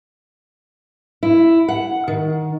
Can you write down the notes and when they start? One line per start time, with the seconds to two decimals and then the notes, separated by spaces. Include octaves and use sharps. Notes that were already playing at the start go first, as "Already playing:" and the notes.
1.23 E4
1.68 F#5
2.08 D#3